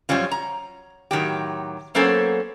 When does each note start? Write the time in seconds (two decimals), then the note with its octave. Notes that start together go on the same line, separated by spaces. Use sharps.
0.09 F#2 F3 G3 C#4 F4
0.31 A#5
1.11 A2 D#3 F#3 G4
1.95 F#3 A#3 B3 C#4 A4 C5